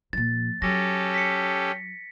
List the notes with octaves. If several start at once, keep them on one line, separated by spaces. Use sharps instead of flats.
A#2 F3 A6
F#3 C#4 G4 A4 A#6
B6 C#7